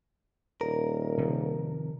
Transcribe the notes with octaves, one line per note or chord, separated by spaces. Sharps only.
D#1 A#4
C3 D#3 F3